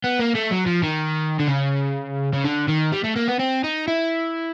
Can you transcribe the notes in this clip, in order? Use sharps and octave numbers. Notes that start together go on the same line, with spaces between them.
B3
A#3
A3
F#3
F3
D#3
D3
C#3
C#3
D3
D#3
G3
A3
A#3
B3
C4
D#4
E4